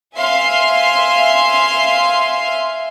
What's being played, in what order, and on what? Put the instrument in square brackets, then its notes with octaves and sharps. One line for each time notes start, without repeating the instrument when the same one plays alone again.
[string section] E5 F5 G#5 C6